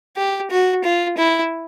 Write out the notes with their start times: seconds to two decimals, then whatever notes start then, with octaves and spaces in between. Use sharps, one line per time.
0.17 G4
0.50 F#4
0.84 F4
1.17 E4